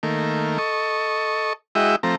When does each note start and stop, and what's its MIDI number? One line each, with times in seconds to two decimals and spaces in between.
0.03 0.58 51
0.03 0.58 57
0.03 0.58 58
0.58 1.53 69
0.58 1.53 75
0.58 1.53 85
1.75 1.96 56
1.75 1.96 64
1.75 1.96 66
1.75 1.96 75
1.75 1.96 76
1.75 1.96 79
2.03 2.15 53
2.03 2.15 57
2.03 2.15 60
2.03 2.15 82